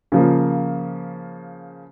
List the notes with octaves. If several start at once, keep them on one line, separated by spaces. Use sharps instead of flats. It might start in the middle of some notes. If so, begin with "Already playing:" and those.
C#3 F3 A#3